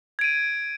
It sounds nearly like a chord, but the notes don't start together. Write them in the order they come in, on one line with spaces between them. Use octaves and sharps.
G#6 D7 D#7